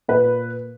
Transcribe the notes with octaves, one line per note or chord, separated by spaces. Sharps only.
A#2 B4